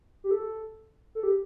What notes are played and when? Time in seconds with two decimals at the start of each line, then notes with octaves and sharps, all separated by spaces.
0.24 G4
0.31 A4
1.15 A4
1.23 G4